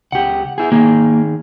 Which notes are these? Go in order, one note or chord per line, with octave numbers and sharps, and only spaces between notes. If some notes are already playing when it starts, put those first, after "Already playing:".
C#2 G4 F#5
E4 G#4
D#3 A#3 G#4